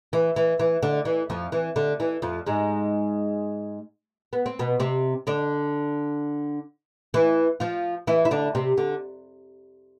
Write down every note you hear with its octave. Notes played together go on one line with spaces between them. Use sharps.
E3
E3
E3
D3
E3
F2 F3
E3
D3
E3
F2 F3
G#2 G#3
B3
C4
B2 B3
C3 C4
D3 D4
E3 E4
F3 F4
E3 E4
E4
D3 D4
C3 C4
D3